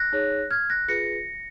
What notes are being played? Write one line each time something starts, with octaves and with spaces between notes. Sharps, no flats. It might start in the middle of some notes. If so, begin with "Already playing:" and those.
Already playing: F#6 A#6
D#4 G#4 C#5
F6 G#6
F#6 A#6
F4 G#4 B4 A#6 C#7